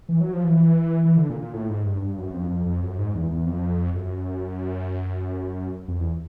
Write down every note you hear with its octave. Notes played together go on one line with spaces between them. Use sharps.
E3
F#3
F3
E3
E3
E3
D3
A#2
A#2
A2
G#2
G2
G2
F#2
F2
F2
F2
F#2
G#2
E2
E2
F2
F#2
F2
E2